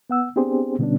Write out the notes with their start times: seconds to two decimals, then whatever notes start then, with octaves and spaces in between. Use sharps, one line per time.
0.10 B3 F#5 E6
0.36 B3 C4 D4 G4 G#4 C5
0.79 B2 D3 G3 B3 C#4 D4